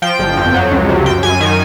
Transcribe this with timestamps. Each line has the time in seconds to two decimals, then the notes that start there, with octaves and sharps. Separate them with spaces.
0.02 F3 G5
0.19 G1
0.37 F2
0.54 F#3
0.71 C#2
0.89 C3
1.06 F#2 G5
1.23 F#2 G#5
1.40 D#3 G#5